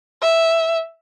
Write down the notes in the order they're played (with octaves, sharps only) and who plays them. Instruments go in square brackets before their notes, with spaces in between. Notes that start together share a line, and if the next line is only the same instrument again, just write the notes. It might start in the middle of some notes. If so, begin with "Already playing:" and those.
[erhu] E5